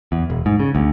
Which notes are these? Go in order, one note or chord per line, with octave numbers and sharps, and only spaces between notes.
E2
E1
G#2
C#3
D2